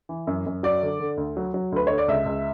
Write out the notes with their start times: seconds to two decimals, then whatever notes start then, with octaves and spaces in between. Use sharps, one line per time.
0.09 E3
0.27 F#2
0.46 F#2
0.63 F#3 D5
0.82 D3
1.00 D3
1.17 D2
1.37 F#3
1.54 F#3
1.72 D2 B4
1.87 D3 C#5
1.98 D5
2.08 C#2 E5
2.26 C#2